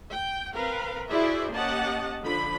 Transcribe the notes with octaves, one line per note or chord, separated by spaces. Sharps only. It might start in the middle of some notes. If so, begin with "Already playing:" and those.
G5
C4 A#4 B4 F5
E4 F#4 G#4 C5 D5 E5
A#3 C#4 G4 D#5 F#5 A5
D3 F3 D4 B5